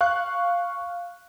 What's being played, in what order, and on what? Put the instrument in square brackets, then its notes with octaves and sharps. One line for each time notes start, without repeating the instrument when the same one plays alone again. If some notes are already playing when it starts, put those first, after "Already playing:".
[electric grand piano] F5 C#6 F#6